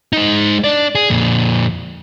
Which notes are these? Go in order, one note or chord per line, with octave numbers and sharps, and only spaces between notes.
G#3 D#4
D4 D5
G#4
F2 A#2